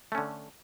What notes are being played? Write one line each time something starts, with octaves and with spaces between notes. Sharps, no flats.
D3 A3 C#4